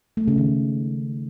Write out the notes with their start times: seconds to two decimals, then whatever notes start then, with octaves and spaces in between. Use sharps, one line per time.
0.17 A3
0.28 C#3
0.38 D#3